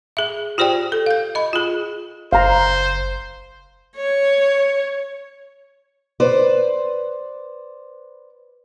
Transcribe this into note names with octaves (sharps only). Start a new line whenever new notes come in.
G#4 E5
F4 G4 C5 D5 G5
A4
F5 G6
D#5 B5
F4 G#4
F#1 C5 F5 A#5
C#5
B4 C5 D5